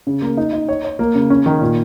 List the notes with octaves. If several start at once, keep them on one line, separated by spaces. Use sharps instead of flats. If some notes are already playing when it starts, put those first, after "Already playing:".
C#3
A#3
D#4
D#4
C#5
C#5
A#3
C#3
C#4
D#3
A#2